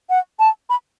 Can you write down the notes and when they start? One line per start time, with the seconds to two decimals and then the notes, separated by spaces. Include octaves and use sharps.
0.10 F#5
0.40 A5
0.70 B5